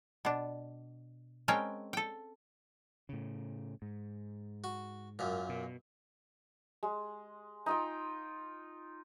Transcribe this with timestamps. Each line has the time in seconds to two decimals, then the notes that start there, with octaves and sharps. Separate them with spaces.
0.25 B2 D4
1.48 G#3 C4 C#4 A#4 G5 A5
1.93 A4 G5
3.09 A2 C#3
3.82 G#2
4.64 F#4
5.19 F#2 A#2
5.49 B2
6.83 G#3
7.66 D#4 F4 G5